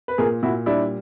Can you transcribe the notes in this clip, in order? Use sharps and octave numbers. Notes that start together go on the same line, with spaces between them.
B4
A#2 G#4 A#4
A#2 E4 F#4
G3 D4 E4